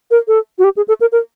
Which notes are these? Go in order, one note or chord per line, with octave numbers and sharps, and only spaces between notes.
A#4
A4
F#4
G4
G#4
A4
A#4
A#4